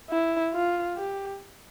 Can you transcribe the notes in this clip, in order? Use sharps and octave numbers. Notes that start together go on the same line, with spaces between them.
E4
F4
G4